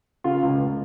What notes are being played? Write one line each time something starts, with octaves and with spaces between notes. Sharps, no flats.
C#3 F4
C#2
C#2